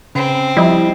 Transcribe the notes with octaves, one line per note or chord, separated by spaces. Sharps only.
C#3 C4
F3 G3 E4 D#5